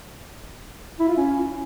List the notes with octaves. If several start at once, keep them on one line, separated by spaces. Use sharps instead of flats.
E4
F4
C#4